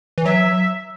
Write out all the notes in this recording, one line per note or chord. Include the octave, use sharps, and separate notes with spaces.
E3
F#3 E5